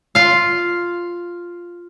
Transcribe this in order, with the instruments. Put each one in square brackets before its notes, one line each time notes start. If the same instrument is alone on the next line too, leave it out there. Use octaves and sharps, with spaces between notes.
[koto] F4 F5